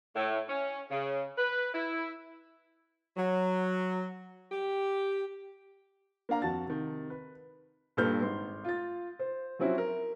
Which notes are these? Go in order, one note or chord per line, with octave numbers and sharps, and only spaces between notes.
A2
C#4
C#3
B4
E4
F#3
G4
A#3 D4 F5 A#5
F2 F#4 A5 A6
C3 D#3
B4
G2 A#2 A4 B4 F6 G6
G#1 C6
F4 A6
C5
F3 F#3 C4 C#4 E4 F#4
A#4